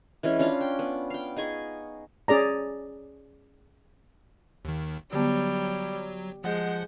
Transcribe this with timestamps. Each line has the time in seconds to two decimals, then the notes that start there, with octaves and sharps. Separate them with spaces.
0.23 E3 G#3 C#4
0.39 C#4 D4 F4 F5
0.61 G5
0.79 B3
1.10 F5 G5
1.36 D#4 G#4 G#5 C#6
2.28 C#4 G#4 D5 A#5
4.65 D#2 D#3
5.13 D3 F#3 G3 B3
6.44 F3 G#3 F#5 G6